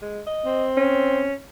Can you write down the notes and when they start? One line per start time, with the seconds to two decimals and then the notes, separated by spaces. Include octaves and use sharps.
0.02 G#3
0.27 D#5
0.46 C4
0.77 C#4